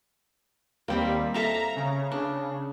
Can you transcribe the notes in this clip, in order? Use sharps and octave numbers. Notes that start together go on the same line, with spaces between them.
D#2 G3 A#3 C4 B5
A4 E5 F5 A#5
C#3
D4